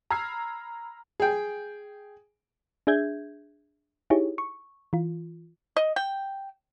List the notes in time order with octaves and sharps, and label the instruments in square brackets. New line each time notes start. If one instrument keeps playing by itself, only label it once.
[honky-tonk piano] A#5 B5 E6 F6 G#6 C7
[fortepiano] G#4 G5
[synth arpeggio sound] D4 G#4 E5 G6 G#6
D#4 E4 G4 G#4 C#5
C#6
E3 F4
[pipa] D#5
G5